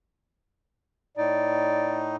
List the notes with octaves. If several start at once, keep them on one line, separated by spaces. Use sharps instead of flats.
A2 D#4 D5